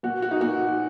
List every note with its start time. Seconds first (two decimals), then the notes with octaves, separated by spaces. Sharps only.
0.03 A#2 F#4
0.22 F#4
0.31 D#4
0.40 A#2 F#4